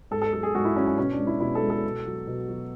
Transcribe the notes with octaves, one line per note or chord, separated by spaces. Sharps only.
G#2 A4
A4
F#3 A4
G#4
G#2 F#4
E4
F#3 C#4
C#4
B2 C#4
D4
G#3
E4
B2 E4
A4
G#3
A4
B2
F#3
B2
F#3